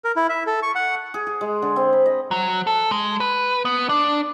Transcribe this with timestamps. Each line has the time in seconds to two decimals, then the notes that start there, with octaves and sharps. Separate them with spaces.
0.05 A#4
0.16 E4
0.29 E5
0.47 A4
0.63 C#6
0.75 F#5
1.14 G#4
1.27 G#4
1.41 G#3
1.62 D3
1.76 C4
1.93 B5
2.06 D#5
2.31 F#3
2.67 A4
2.91 G#3
3.20 B4
3.65 B3
3.89 D4